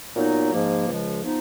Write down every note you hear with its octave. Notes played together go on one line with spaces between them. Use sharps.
A#2 F#3 B3 D#4
G#2 F3 A#3
C#2 C#3 F3 G#3
F3 B3 D#4